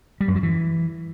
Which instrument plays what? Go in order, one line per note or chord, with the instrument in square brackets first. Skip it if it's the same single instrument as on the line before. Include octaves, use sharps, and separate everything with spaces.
[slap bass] G3
F#2
F#3
E3